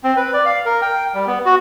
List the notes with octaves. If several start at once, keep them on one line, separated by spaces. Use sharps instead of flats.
C4
B4
D5
F5
A#4
G5
G3
B3
F#4